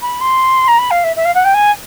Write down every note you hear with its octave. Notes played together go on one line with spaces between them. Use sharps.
B5
C6
A#5
B5
F5
E5
E5
F5
F#5
G5
G#5